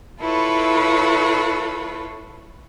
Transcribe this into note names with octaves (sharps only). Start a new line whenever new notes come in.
E4 F4 A4 B4 C#5 B5